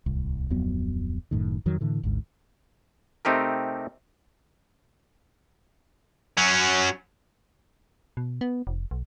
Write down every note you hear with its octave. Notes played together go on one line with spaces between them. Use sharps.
D1 C2
D1 F2 F#3 B3
F#1 F#2 A2 D#3
F2 D#3 F#3
A2 D3 E3
G#1 D2 G#2
C3 A3 C4 D#4 G4 A#4
F#3 C#4
B2
B3
F1
B1